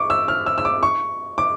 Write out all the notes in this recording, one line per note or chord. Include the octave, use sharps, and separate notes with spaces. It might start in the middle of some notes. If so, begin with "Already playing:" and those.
Already playing: C#6 D6
E6
F6
E6
E6
D6
C#6
D6